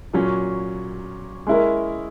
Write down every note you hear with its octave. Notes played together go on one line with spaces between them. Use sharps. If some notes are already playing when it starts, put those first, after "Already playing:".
A#2 F#3 C#4
G#3 C#4 E4 A#4